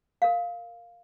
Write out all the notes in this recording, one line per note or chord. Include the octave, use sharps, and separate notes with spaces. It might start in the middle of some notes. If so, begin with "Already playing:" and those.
A#4 F5